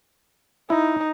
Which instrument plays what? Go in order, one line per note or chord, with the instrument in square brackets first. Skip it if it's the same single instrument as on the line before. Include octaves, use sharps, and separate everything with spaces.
[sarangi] D#4 [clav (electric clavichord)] E4